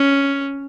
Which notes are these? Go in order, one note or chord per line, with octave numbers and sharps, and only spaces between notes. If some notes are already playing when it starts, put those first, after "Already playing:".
Already playing: C#4